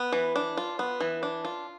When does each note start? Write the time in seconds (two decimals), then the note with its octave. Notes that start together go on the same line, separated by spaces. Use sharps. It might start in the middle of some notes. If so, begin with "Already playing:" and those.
Already playing: B3
0.12 E3
0.36 D4
0.57 F4
0.79 B3
1.00 E3
1.23 D4
1.45 F4